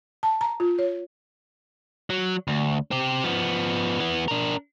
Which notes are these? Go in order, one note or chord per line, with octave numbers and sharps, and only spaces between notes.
A5
A#5
F4
C#5
F#3
D2
C4 G4
F3 B3
E3 B3
D4 A#4